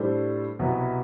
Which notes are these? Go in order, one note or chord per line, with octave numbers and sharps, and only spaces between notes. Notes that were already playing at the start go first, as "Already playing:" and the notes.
Already playing: A2 G3 D4 A4 C5
C2 B2 F#3 B3 F#4